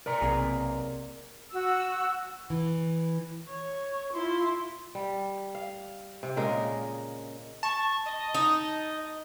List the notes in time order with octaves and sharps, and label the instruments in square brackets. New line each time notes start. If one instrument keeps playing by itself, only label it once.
[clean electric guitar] A#4 D5 A#5
[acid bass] B1 [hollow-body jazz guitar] C3 A#3 G#4
[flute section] F#4 E6
[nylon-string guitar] E3
[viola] C#5
[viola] E4 C6 [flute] F4
[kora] G3
F5
C3
A#2 C#3 G#3 A#4
[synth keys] A5 [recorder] C#6
[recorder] D#5
[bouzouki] D#4